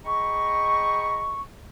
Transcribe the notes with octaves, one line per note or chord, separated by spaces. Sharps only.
G#4 D#5 G5 A#5 B5 C#6